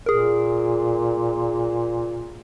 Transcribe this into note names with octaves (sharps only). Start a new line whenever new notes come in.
A#2 G#4 A#4